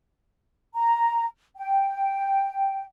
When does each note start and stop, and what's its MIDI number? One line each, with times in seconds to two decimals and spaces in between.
0.74 1.26 82
1.56 2.84 79